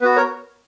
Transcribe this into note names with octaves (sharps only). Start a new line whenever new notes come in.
B3 F#4 B4
A#4 C#5